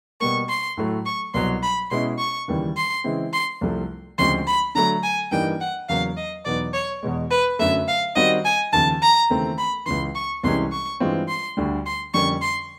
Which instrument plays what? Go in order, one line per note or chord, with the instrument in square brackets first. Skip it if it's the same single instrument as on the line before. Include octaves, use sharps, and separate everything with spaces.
[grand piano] B2 G3 A#3 [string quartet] C#6
[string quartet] C6
[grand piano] A2 F#3 A3
[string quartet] C#6
[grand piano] C2 B2 F#3 [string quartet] C6
[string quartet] B5
[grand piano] B2 G#3 C#4 E4 [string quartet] C6
[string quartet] C#6
[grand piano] D#2 C#3 E3 G3
[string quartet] C6
[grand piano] C#3 E3 G#3 C4 E4
[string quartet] C6
[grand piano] C2 C3 F3 A3
[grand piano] D2 C#3 F3 G#3 C4 [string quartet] C6
[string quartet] B5
[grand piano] D3 F#3 A3 [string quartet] A#5
[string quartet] G#5
[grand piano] G2 E3 G3 A#3 D#4 [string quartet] G5
[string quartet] F#5
[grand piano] E2 C#3 F#3 A#3 [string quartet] F5
[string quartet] D#5
[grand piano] E2 B2 F#3 B3 D#4 [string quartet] D5
[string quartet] C#5
[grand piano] E2 B2 G#3
[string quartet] B4
[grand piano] F#2 D3 F#3 A3 [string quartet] E5
[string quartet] F5
[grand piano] D#3 G3 C4 D#4 F#4 [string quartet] D#5
[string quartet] G#5
[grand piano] D#2 C#3 F3 [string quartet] A5
[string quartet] A#5
[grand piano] D#2 C#3 E3 A3 C4
[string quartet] B5
[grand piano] C#2 C#3 E3 [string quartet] C6
[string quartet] C#6
[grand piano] C2 C3 E3 G#3 C#4 [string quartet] C6
[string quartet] C#6
[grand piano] G2 E3 G#3 C4 F4
[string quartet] C6
[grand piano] D2 D3 G3
[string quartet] C6
[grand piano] F2 D3 G3 A#3 C#4 [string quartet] C#6
[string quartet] C6